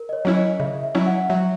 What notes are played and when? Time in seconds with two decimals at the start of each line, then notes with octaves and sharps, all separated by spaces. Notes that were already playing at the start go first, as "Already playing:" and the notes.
Already playing: A#4
0.09 D#5
0.13 C#5
0.25 F#3 C#4 E4 C#5
0.37 D#5
0.60 C#3 E5
0.83 E5
0.95 F#3 C#4 E4
1.07 F#5
1.30 F#3 E5